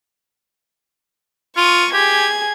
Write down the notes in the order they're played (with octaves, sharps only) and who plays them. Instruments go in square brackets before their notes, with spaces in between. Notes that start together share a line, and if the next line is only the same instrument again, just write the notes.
[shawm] F4 [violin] C#6 D#7
[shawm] G4 [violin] G#4 G#6